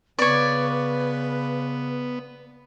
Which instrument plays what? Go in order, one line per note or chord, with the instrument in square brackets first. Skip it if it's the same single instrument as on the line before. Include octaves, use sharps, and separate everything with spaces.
[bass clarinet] C#3 [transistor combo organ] B3 [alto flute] B4 [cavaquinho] C#5 D5